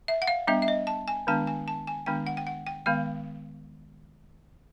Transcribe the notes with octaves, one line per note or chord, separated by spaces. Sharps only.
E5
F#5
F5
G3 B3 D4 E5
E5
D#5
A5
G#5
D#3 G#3 B3 D4 A5
G#5
A5
G#5
D#3 G#3 B3 D4 G5
F#5
G5
F#5
G5
D#3 G#3 B3 F5